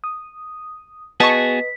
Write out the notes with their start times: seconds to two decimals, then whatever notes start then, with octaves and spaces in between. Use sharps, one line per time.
0.04 D#6
1.20 B3 F#4 G#4 B4 D#5 A5 C#6 B6